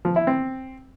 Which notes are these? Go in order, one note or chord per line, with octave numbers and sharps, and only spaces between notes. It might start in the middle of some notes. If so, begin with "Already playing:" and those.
F3
E4
C4